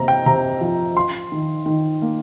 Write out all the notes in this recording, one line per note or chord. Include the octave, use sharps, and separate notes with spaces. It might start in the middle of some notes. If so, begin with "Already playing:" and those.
Already playing: C3 A#3 A#5
G5
C3 A#5
F3
F4 C6
D#3
D#3
A#3